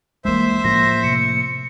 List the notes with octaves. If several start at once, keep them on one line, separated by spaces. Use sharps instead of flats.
C#2 E3 G#3 A#3 C5 E5
A2 D3 F3 A#3 C#4 A#6
C3 C#7